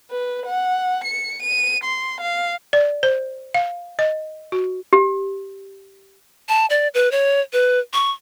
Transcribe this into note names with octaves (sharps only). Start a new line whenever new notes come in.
B4
F#5
C#7
D#7
C6
F5
D5
C5
F5
D#5
F#4
G4
A5
D5
B4
C#5
B4
C#6